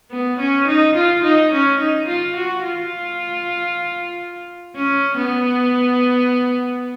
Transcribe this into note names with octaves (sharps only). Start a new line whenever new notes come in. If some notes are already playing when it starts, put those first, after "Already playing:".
B3
C#4
D#4
F4
D#4
C#4
D#4
F4
F#4
F4
C#4
B3